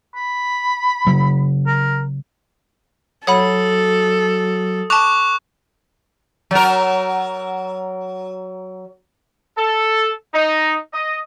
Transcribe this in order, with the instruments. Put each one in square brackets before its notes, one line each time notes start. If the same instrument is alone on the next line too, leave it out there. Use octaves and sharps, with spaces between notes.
[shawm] B5
[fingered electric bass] C#3 F#3
[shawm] A#4
[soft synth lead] F#3 [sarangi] A4 [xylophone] C#5 F#5 B5 [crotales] D#6
[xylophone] A5 F7 [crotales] C#6 D6 F#6
[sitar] F#3 A#4
[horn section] A4
D#4
D#5